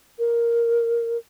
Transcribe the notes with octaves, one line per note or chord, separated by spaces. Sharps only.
A#4